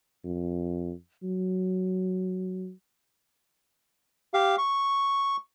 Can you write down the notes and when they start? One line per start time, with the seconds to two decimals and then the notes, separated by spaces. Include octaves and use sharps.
0.24 F2
1.24 F#3
4.34 G4 F5
4.58 C#6